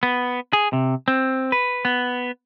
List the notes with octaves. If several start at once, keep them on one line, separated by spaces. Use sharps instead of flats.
B3
G#4
C3
C4
B4
B3